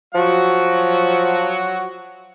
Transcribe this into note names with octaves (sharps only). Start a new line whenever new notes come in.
F3 F#3 F#4 F#5